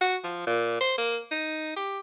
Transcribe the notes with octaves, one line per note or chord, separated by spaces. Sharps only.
F#4
F3
A#2
C5
A#3
D#4
G4